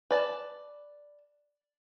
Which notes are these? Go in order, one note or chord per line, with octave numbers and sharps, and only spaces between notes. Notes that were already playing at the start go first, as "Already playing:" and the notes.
B4 D5 A5